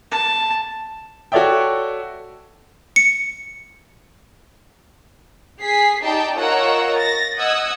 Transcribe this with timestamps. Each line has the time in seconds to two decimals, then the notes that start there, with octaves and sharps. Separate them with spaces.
0.11 A5
1.32 F#4 A4 C#5 D5 E5 G5
2.96 C#7
5.62 G#4 B6 C7
6.04 D#4 G4 D5 G5 A5
6.37 F4 A#4 C#5 D#5 F#5 E6
6.97 A6 A#6
7.36 D#5 F#5 D#6 E6 G#6